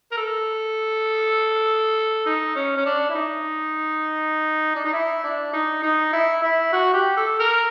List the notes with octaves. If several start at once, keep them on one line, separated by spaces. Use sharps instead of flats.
A#4
A4
D#4
C#4
C#4
D4
E4
D#4
D4
D#4
E4
D4
D#4
D#4
E4
E4
F#4
G4
A4
A#4